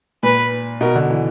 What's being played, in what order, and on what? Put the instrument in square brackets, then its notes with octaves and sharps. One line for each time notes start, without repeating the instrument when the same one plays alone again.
[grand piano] A#2 [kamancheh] B4
[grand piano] B2 [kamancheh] A#4
[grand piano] D3
E3